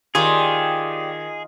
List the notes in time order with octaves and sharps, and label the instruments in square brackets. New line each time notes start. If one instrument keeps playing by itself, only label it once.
[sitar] D#3 [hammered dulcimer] F4 [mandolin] G4 C#5 D5 [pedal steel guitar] G#4